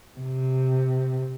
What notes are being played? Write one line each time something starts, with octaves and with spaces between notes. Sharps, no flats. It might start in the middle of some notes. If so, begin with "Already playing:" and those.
C3